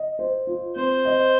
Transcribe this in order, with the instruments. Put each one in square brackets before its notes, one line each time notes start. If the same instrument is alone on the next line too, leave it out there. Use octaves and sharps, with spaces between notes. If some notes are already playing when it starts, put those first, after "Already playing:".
Already playing: [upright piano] D#5
C5
F4
[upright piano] C4 [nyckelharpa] C5
[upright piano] D#5